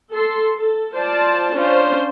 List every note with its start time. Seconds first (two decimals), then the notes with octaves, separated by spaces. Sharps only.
0.13 A4 C6
0.57 A4
0.94 F4 C5 D5 A5
1.55 C#4 D4 F4 C5